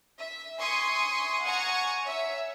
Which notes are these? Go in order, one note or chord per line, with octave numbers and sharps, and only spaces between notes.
E5
E5 G#5 C6 C#6 D#6
F#5 G#5 A#5 C#6
C#5 E5